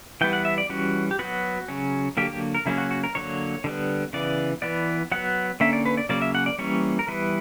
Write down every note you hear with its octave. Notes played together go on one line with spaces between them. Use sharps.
E3 G3 B3 G5
F#5
E5
D5
E3 G3 C#4 F#4
G4
F#3 B3 F#4
C#3 F#3 C#4
D3 F#3 A#3 G4
G4
A#4
C#3 F#3 A#3 C#4 E4
F#4
F#4
A#4
D3 F#3 A#3 C#5
D3 G3 B3
C#3 E3 B3 D5
E3 B3 D5
F#3 B3 F#5
D3 A#3 C#4 E5
D5
B4
D5
C#3 F#3 A#3 C#4 D5
E5
F#5
D5
E3 G3 A#3 C#4 C#5
A#4
E3 G3 B3 B4